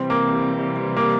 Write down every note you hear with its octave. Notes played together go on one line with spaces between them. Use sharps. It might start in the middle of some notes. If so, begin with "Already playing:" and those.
Already playing: C3 E3 G3 C4
A#3
A#3